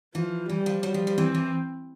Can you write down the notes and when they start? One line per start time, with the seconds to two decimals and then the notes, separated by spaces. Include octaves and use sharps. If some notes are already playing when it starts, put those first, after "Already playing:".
0.15 E3 F3
0.49 E3 G3
0.66 F3
0.83 F#3 G3
0.94 F3
1.07 F3
1.18 E3 C4
1.35 E3